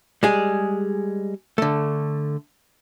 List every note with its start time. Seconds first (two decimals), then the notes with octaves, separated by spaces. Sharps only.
0.23 G3 G#3 G#4
1.58 D3 A3